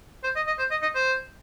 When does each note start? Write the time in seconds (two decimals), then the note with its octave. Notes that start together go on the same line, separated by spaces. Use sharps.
0.24 C5
0.36 D#5
0.47 D#5
0.58 C5
0.71 D#5
0.82 D#5
0.95 C5